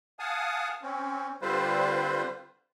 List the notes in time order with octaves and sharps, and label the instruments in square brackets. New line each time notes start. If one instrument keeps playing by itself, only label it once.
[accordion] F5 F#5 G#5 A5 D#6
C4 C#4
D3 G3 C4 F4 B4 C5